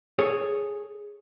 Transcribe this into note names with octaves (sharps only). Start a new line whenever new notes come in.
G#4 A4 C#5